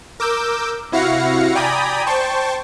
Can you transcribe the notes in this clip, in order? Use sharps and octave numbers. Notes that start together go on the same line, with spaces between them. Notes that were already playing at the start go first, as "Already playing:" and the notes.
A#4 D6 E6 G6
C3 E4 F#4 F5 A#6 C#7
D5 G5 G#5 A#5 B5 D#6
C5 G5 A5 C#6